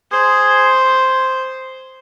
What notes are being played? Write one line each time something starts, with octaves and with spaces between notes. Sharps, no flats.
G#4 C5